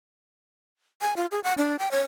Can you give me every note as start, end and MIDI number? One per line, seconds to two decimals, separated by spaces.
1.01 1.14 80
1.16 1.26 65
1.31 1.40 68
1.44 1.54 78
1.58 1.76 62
1.79 1.91 79
1.91 2.01 73